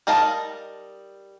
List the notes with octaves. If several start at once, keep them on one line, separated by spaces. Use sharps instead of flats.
G3 D#4 A#4 F5 A5